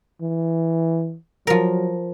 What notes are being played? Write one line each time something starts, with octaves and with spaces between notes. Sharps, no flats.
E3
F3 F#3 A#4